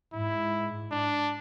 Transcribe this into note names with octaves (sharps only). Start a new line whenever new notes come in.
G#2 E4
D4